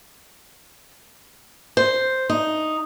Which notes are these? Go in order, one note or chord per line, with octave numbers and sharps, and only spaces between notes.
C5
D#4